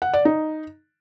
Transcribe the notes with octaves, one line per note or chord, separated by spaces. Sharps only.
F#5
D5
D#4